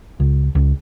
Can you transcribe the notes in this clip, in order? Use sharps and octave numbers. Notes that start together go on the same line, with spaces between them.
C#2
C#2